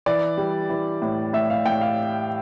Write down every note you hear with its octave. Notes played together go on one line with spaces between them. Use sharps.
E3 D5
G3
E3
A2
A2 E5
F5
A2 G5
F5